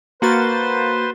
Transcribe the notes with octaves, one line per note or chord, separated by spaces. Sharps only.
A#3 F#4 B4 C5 C6 A6